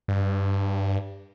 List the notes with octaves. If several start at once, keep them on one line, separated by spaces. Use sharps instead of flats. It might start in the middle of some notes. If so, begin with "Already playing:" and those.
G2